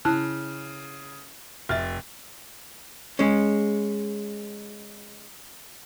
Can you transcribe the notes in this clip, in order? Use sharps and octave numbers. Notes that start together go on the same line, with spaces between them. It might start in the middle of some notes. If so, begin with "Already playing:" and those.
C#3 E4 A5 F#6
F1 E5 F6 A6
G#3 C#4